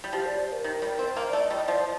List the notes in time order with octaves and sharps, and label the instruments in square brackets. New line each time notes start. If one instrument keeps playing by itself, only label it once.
[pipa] G3
[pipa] F3 [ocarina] G4
[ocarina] D5
C5
A#4
[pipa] D#3
G3
C4
[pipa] A#3 [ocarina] C5
[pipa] A3 [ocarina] D5
[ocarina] D#5
[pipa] G3
[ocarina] D#5
[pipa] F3 [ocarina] D5
[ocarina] C5